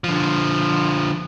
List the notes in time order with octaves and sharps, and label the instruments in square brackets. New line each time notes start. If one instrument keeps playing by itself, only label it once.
[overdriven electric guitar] D3 F3